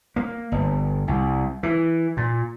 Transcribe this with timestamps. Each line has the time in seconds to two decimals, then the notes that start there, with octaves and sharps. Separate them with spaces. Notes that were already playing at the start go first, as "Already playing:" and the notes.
0.16 A#3
0.52 G1
1.08 C2
1.63 E3
2.17 A#2